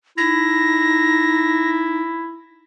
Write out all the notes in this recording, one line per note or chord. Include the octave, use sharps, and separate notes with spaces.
D#4 E4 A#6